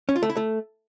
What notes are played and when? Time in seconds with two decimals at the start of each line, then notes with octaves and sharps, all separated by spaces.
0.09 C#4
0.16 F4
0.23 A3
0.30 E4
0.37 A3